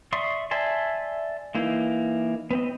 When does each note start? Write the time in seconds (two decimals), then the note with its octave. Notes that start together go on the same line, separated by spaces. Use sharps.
0.12 D5 E5 C6 C#6 D#6
0.51 D5 E5 G#5 A5 C6
1.55 E3 A#3 D#4 E4
2.51 B3 C4 D#5